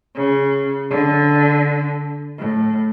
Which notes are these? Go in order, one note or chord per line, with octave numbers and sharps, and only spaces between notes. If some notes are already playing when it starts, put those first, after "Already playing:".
C#3
D3
A2